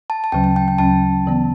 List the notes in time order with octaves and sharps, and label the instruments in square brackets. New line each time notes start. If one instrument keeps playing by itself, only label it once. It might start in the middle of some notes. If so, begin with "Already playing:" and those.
[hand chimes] A5
A5
[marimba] D2 C#3 F#3 C#4 [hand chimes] G5
[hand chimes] A5
G5
G5
[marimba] D2 C#3 F#3 C#4 [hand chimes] A5
[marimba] C#3 E3 B3